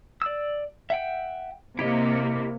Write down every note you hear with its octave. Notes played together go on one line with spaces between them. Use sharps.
D5 E6
E5 F#5 G5
C3 A#3 E4 G4 D#5